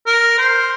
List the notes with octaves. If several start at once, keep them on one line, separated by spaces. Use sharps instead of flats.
A#4
C5